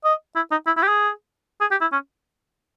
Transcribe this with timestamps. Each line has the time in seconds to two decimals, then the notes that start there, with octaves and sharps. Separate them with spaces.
0.04 D#5
0.36 E4
0.51 D#4
0.67 E4
0.77 E4
0.83 G4
0.88 G#4
1.61 G#4
1.71 G4
1.81 E4
1.92 C#4